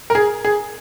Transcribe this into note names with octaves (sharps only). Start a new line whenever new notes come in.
A#4
G#4
G#4